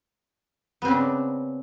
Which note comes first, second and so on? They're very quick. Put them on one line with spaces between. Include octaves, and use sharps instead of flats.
B3 C4 C#3 D4